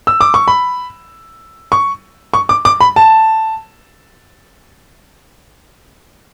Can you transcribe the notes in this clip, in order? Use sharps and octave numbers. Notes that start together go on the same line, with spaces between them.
E6
D6
C#6
B5
C#6
C#6
D6
D6
B5
A5